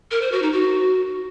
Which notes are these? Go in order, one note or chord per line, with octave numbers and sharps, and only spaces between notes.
A#4
C5
F#4
D#4
F#4